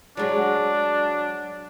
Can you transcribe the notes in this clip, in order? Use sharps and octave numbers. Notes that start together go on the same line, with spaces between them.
F#3 G#3 D4